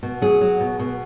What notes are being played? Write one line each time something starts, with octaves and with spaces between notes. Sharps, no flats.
B2
F#3 G#4
F#3
B2
B2